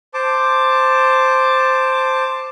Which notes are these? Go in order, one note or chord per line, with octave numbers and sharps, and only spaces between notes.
C5 A5 D6